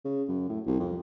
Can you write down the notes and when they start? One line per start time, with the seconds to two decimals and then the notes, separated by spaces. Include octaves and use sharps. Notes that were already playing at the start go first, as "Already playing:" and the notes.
0.05 C#3
0.29 F#2
0.49 A2
0.67 C2
0.80 F2